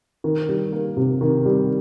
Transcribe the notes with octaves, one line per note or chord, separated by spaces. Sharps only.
D#3
G3
A#3
C3
D#3
G3